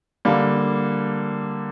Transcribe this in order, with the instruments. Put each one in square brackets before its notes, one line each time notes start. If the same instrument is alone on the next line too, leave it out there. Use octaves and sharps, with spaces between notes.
[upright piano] D3 G3 A#3